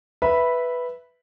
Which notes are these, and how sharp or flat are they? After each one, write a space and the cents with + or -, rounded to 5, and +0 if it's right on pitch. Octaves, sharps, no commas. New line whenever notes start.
B4 +0 E5 +0 B5 -5